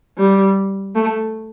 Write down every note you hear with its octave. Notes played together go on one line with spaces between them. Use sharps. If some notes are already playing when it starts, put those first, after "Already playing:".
G3
A3